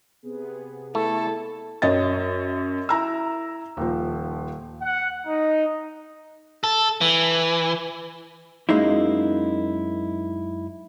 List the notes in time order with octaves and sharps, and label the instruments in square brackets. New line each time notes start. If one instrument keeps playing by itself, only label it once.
[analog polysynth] C3 B3 G#4
[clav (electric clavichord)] A3 [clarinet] E4 [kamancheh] A4
[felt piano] F#2 C#5 D#5 A6
E4 A#5 E6
D#1 F3
[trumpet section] F#5
D#4
[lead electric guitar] A4
E3
[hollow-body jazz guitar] F#2 G#3 A#3 D#4 E4